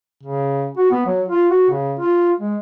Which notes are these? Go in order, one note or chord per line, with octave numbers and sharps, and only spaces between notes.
C#3
F#4
B3
F#3
F4
F#4
C#3
F4
G#3